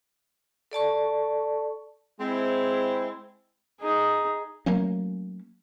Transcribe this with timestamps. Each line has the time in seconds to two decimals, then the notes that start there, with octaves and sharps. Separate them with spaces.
0.71 A4 D5 A5 C#6
2.20 G#3 C4 E4
3.81 D#4 G#4
4.66 F#3 A3 A#3 C#4